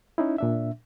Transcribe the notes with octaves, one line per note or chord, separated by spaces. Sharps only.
C#4 D#4 E4
A#2 D4 E5